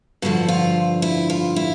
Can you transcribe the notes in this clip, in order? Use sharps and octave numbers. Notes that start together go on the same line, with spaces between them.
G2 D3 F3 F#4
F4
E4
F4
E4